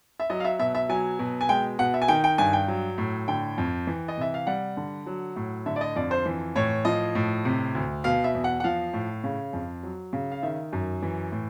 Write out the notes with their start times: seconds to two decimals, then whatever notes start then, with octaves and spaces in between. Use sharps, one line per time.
0.20 E5
0.30 F#3 D#5
0.40 F5
0.45 E5
0.59 B2 E5
0.75 E5
0.89 F#3 G#5
1.19 B2
1.41 G#5
1.49 G#3 G5
1.79 B2 F#5
1.94 E5
2.02 G#5
2.08 D#3 G5
2.24 G5
2.38 G2 G#5
2.53 G5
2.68 F#3
2.98 A2
3.28 D3 G5
3.58 F2
3.87 E3
4.08 D#5
4.17 C3 E5
4.34 F5
4.47 G3 F#5
4.77 D3
5.06 F#3
5.36 A2
5.66 D3 E5
5.76 D5
5.81 D#5
5.96 F2 D5
6.11 C5
6.26 E3
6.56 A2 C#5
6.85 F3 D#5
7.15 A2
7.45 C3
7.75 D2
8.04 B2 F5
8.24 E5
8.35 E2
8.44 F#5
8.60 F#5
8.64 F3 F5
8.93 A2
9.24 C#3
9.53 F2
9.83 F#3
10.13 C#3
10.32 F5
10.43 D#3 E5
10.73 F#2
11.02 E3
11.32 A2